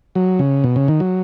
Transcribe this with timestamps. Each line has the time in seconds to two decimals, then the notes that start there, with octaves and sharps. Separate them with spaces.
0.15 F#3
0.39 C#3
0.64 B2
0.76 C#3
0.88 D#3
1.00 F#3